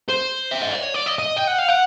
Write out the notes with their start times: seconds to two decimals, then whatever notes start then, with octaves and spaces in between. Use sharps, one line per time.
0.09 C5
0.51 E5
0.61 D#5
0.72 D5
0.82 C#5
0.94 D5
1.06 D#5
1.19 D#5
1.37 G5
1.47 F#5
1.59 F5
1.69 F#5